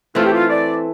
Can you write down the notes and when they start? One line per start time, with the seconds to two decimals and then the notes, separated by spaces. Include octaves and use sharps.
0.15 E3 A3 C4 F4
0.25 G4
0.34 F4
0.49 D5